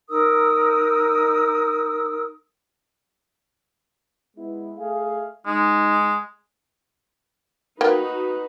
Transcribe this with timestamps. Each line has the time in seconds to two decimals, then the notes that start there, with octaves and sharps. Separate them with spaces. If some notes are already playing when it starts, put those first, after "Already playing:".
0.09 D#4 A#4 D#6 E6
4.37 G#3 B3 E4
4.77 A3 G#4 F5
5.46 G#3 D#4
7.81 A#3 B3 D#4 F#4 B4 G5